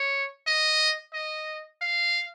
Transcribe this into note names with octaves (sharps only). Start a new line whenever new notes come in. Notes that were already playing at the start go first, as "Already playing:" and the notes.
Already playing: C#5
D#5
D#5
F5